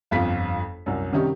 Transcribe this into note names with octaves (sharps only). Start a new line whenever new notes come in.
G1 F2 F4 B6
C2 F#2
C3 D#3 G3 C#4 D#4 G4